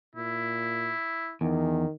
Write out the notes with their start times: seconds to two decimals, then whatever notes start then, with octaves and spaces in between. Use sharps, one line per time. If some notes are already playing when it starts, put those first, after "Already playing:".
0.15 A#2 E4
1.41 E2 D#3